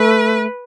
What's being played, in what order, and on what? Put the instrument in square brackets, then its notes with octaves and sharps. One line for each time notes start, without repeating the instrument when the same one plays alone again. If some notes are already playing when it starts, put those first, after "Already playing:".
Already playing: [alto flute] A3 [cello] B4